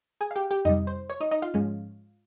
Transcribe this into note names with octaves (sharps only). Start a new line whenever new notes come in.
G#4 G#5
F5
G4 G5
G4 G5
F2 C3 G3 D#4 D#5
C5
C#5
D#4 D#5
D#4 D#5
F4 F5
G#2 F3 G#3 C#4